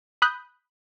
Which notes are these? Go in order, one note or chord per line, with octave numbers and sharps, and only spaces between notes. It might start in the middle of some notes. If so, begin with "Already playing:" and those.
B5 D#6 F#6 G6